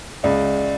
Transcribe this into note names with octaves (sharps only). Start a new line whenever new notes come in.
C#2 D5 E5